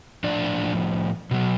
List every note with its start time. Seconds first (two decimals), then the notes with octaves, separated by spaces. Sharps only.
0.24 A2 F3 D4 D5
1.31 B2 F#3